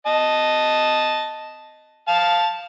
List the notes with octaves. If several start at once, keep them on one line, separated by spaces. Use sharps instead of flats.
D#5 A5
F5 A5